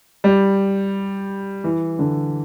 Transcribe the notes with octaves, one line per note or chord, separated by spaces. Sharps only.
G3
E3
D3